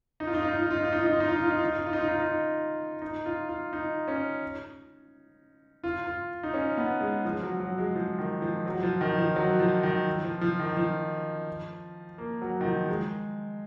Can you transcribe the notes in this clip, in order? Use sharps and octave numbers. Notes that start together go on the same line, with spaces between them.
D#4
F4
D#4
F4
D#4
F4
D#4
F4
D#4
F4
D#4
F4
D#4
F4
D#4
F4
D#4
F4
D#4
F4
D#4
F4
D#4
F4
D#4
F4
D#4
F4
D#4
D#4
F4
F4
D#4
C#4
F4
F4
D#4
C#4
B3
G#3
F3
F#3
F#3
G#3
F3
D#3
F3
F#3
F3
D#3
F3
F#3
F3
D#3
F3
F3
D#3
F3
A#3
F#3
D#3
F3
G#3